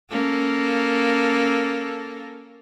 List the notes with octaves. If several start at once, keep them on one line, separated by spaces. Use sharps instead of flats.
A#3 C#4 A4